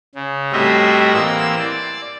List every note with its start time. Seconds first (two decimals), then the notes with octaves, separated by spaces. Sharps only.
0.15 C#3
0.52 A2 G3 C4 F#4 D#5 E5
1.14 E3 A#3 C4 E6
1.59 D5